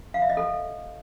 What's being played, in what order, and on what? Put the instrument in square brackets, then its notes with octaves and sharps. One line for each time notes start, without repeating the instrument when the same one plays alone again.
[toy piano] F5
E5
D#5
A4